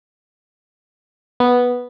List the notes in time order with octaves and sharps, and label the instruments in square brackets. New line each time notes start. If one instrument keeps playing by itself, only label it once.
[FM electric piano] B3